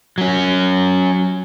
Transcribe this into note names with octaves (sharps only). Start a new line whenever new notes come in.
F#3 C#4